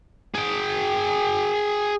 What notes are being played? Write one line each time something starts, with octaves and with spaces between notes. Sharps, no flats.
G#4 G5